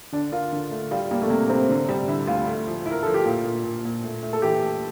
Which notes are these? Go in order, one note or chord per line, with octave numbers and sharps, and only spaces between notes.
D3 D4
F4 A#4
D3
A3
G3 F4
G3 A#3
A3
C3 A#3
C3 C4
D3
G3
D3 E4
D2 F4
A3
F3
E4
A#4
F3 A4
G4
A#2 F4
A#2
A#2
A#2
A3
A3
A4
E3 G4
A3